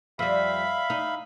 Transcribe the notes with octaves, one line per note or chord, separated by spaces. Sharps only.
F2 G3 E5 F5 B5
D#4